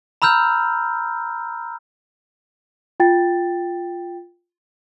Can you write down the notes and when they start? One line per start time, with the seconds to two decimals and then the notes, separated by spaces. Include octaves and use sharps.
0.22 A#5 B5 E6 F6 G6
3.00 F4 G5 A6